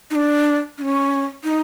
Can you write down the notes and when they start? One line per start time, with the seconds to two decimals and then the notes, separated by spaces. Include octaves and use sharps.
0.11 D#4
0.15 D4
0.78 D4
0.82 C#4
1.44 D#4